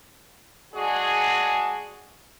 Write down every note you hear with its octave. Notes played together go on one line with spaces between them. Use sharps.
G#3 D4 F#4 G#4